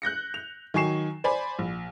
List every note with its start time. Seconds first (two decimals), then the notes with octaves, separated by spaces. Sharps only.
0.02 F#6 G6 A#6 C#7
0.34 F7
0.74 D#3 F#3 G#5 C#6 C7 E7
1.24 C5 D5 G#5 B5
1.59 A#1